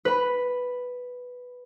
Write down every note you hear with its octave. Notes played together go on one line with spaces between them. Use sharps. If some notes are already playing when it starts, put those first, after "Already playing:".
B4 B5